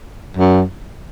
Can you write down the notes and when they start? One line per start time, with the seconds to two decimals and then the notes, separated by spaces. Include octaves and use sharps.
0.37 F#2